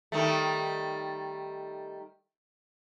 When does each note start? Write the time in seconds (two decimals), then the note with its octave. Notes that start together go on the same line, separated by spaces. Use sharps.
0.12 D#3 G3 A3